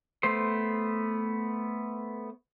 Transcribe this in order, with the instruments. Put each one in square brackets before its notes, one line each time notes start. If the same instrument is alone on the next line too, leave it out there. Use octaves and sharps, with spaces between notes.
[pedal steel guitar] A3 B3 C5 C6